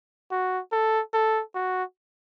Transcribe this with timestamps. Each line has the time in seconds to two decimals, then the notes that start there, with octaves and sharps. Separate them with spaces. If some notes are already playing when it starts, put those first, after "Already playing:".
0.31 F#4
0.72 A4
1.13 A4
1.55 F#4